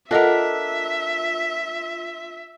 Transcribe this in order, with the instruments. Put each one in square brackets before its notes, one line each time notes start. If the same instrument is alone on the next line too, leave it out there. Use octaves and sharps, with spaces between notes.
[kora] D4 A#4 [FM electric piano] F4 B6 [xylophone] A4 D#5 F#5 [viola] E5